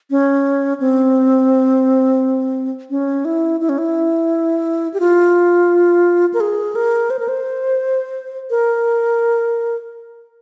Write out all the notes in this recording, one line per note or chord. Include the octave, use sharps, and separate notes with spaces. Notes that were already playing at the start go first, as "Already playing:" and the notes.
C#4
C4
C#4
E4
E4
C#4
E4
G4
F4
A#4
G#4
A#4
C5
A#4
C5
A#4